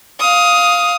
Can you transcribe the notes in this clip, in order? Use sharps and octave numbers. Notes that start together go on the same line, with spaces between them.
F5 D#6